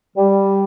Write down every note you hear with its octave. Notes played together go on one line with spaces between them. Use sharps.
G3